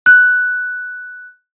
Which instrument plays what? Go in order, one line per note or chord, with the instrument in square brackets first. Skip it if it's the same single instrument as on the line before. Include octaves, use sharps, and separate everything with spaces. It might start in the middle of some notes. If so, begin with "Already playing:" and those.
[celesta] F#6